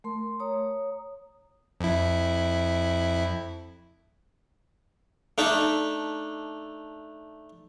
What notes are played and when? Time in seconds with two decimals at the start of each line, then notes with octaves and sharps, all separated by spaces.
0.04 A3 A#4 C6
0.40 C#5 A#5 D#6
1.81 F2 E4
5.38 A3 D4 D#4 E5